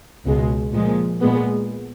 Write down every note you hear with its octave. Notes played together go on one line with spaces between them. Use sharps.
C#2 B2 G#3
A#2 F3 G#3
A#2 G#3 B3